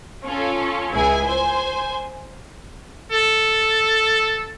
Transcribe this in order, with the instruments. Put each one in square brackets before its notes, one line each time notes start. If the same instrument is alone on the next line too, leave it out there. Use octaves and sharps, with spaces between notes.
[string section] C#4 F4 A4
C#2 E4 G#4 G#5
C5 G#5
[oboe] A4